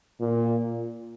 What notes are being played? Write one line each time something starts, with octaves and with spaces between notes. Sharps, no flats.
A#2